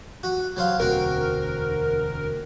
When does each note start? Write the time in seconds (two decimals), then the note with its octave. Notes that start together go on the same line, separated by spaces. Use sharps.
0.23 F#4
0.57 F#3 C5 F5
0.80 E1 D2 C4 F#4 A#4